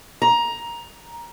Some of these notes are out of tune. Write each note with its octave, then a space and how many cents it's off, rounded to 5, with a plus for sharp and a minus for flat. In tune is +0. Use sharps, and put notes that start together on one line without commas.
A#5 +15